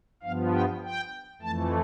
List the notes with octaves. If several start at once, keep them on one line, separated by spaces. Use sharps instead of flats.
G2 F3 B3 F5
G5
G5
F2 E3 A3 A5